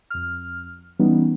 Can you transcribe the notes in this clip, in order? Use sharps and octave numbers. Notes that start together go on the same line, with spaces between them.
F2 F6
E3 G3 B3 C#4 D#4